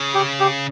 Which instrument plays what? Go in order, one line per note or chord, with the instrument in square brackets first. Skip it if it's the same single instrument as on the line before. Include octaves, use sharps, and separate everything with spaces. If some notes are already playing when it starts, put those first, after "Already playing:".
Already playing: [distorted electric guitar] C#3
[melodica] G4
G4